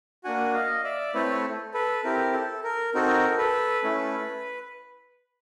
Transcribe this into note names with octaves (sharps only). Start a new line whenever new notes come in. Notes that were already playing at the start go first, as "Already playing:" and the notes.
A#3 D4 F#4 F#5 G#5
D#5 F5
D5 E5
A3 C4 E4 A4 B4 C#5
A4 B4
C4 E4 G4 A#4
A4
A#4
C4 D#4 F#4 A4 A#4
A4 B4
A3 C#4 E4 A4